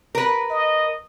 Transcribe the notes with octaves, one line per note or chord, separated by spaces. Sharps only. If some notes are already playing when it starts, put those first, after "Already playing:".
A#4 B4
D#5